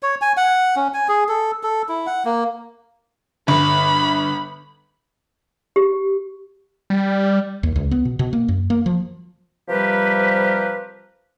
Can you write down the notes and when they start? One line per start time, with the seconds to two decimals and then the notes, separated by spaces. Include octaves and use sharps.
0.03 C#5
0.22 G#5
0.37 F#5
0.76 C#4
0.94 G#5
1.09 G#4
1.29 A4
1.63 A4
1.89 E4
2.07 F#5
2.25 A#3
3.48 G1 B5
5.76 G4
6.90 G3
7.63 D#2
7.76 C#2
7.91 B3
8.05 B2
8.19 B2
8.33 A#3
8.48 F#2
8.70 A#3
8.86 F3
9.69 C3 F3 G3 G4 A#4 B4